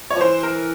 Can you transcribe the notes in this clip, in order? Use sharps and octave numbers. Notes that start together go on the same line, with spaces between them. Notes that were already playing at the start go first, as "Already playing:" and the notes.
C#5
F3
E3 C5
A#4